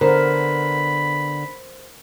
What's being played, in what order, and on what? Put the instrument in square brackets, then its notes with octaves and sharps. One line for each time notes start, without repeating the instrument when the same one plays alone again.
[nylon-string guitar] D3 B3 [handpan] A#4 [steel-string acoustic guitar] C5 [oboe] B5